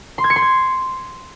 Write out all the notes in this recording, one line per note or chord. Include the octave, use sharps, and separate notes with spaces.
C6
G#6
C#7
C6
G#6